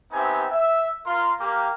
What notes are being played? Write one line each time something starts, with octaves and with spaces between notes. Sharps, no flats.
B3 C4 D#4 G4 E5 G#5
E5
F4 A#4 C6
A#3 G4